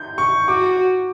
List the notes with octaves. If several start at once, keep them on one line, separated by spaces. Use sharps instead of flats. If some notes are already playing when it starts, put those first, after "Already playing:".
Already playing: G6
C#6
F#4 D6